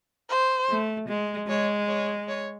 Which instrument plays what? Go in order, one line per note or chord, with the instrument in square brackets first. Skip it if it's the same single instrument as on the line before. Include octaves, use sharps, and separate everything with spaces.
[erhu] C5
[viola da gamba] A3
G#3
[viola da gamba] G#3 [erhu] C#5
[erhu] C#5
C#5